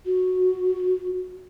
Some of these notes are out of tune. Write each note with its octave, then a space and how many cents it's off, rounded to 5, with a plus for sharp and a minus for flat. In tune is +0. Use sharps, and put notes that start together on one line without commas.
F#4 -5